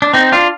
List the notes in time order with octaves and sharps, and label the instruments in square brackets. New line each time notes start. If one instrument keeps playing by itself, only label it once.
[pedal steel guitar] D4
C4 D#4
D4 F4